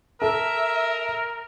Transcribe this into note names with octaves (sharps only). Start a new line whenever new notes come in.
A4 A#4 E5